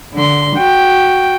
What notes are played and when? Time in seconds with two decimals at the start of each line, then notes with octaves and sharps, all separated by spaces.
0.14 D3 C6
0.56 F#4 G5